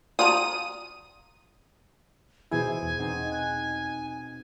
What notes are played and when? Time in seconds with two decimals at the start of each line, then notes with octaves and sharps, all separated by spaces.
0.19 F4 D5 A#5 D#6 D#7
2.51 B2 E3 E4 G#4 C5 G#5
2.83 E2
2.99 B2 C4 D#4
3.32 F#6 G#6